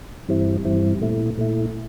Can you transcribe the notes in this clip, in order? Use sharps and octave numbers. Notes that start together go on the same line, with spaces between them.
G2 E3 G3 C4 E4
G2 E3 G3 C4 E4
A#2 A3 E4
A#2 A3 E4